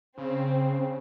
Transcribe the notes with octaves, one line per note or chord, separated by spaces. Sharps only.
C#3 C4